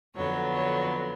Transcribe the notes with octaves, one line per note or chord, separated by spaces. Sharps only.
F2 D3 F#3 B3 C#5
C#5